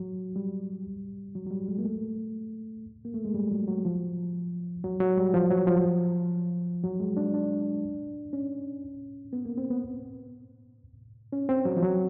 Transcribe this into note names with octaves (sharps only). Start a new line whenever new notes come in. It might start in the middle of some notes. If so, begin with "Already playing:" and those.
Already playing: F#3
G3
F#3
F#3
G3
G#3
A#3
A3
A#3
A3
G#3
G3
F#3
F#3
F3
F#3
F#3
G3
F3
F#3
F3
F#3
G#3
D4
D4
C#4
B3
A#3
C4
B3
C#4
C4
F#3
F3
F#3